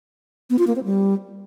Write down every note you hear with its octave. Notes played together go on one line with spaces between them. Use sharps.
B3
F4
A#3
C4
G3